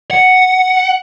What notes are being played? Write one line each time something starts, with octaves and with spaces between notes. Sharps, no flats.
F#5